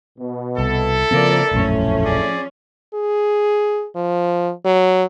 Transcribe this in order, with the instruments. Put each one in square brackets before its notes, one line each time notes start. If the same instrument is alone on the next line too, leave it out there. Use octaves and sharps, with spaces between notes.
[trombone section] B2
[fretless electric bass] C2 [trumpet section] E4 A4
[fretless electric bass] C#3 A#3 C4 [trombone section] F3 [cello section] A#4 D5
[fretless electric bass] E1 A#1 F#2 [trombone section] A2 A3 [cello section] F3 C#4
[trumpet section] G#4 D5
[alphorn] G#4
F3
F#3